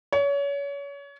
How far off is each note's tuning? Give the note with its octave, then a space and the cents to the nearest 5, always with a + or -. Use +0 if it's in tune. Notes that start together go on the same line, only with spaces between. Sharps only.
C#5 +30